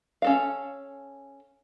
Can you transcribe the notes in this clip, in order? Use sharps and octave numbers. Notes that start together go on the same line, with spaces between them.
C#4 A4 F5